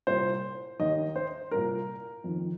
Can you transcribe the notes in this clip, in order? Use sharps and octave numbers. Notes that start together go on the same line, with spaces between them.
C2 A#2 C5
D#2 D#3 D#5
C5
C2 A#2 A#4
F2 D#3